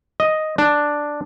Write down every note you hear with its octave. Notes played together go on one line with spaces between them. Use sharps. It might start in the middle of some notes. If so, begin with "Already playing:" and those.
D#5
D4